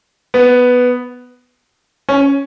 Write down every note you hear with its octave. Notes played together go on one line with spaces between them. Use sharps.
B3
C#4